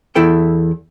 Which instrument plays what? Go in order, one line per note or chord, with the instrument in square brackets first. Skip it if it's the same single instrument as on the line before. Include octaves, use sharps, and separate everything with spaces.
[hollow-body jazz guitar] E2 E4 A4 G5